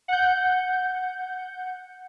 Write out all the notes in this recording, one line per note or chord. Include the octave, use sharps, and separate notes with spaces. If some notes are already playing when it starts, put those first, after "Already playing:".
F#5 G6